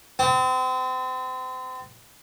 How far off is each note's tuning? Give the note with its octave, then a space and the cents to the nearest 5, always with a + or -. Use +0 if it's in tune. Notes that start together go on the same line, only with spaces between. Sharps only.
C4 -35